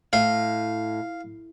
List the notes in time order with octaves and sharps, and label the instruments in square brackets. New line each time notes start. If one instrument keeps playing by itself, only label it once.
[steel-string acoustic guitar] A2 [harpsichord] F5